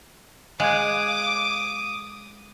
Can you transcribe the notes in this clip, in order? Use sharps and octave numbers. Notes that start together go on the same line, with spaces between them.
G#3 F5 D6 D#6 F#6 G#6